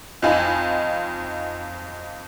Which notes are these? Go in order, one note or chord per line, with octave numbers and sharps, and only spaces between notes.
F2 D#4 F4 G#5 B5